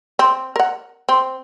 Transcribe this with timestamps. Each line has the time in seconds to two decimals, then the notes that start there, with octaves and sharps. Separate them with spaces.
0.19 C4
0.56 A#4 F#5
1.09 C4